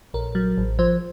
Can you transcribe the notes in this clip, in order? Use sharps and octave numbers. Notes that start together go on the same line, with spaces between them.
A#1 A#4
F#3
A1
F3 C5